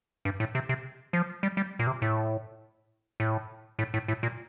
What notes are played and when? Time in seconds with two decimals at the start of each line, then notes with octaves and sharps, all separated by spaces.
0.25 G2
0.40 A2
0.55 C3
0.69 C3
1.13 F3
1.43 G3
1.57 G3
1.79 A#2
1.87 C3
2.02 A2
3.20 A2
3.79 A2
3.94 A2
4.08 A2
4.23 A#2